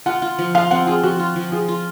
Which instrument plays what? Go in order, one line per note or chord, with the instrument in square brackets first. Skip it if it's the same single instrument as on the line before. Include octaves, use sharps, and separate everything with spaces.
[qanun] F4 [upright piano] F#5
[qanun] F4
F3
[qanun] F4 [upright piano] F5
[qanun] C4 [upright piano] F#5
[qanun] F4 [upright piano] G#4
[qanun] F3 [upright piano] F#4
[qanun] F4
F3
[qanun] F3 [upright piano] G#4
[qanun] F4